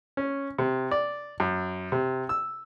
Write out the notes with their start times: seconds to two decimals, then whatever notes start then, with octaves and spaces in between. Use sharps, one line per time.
0.17 C#4
0.58 C3
0.91 D5
1.40 F#2
1.92 C3
2.29 E6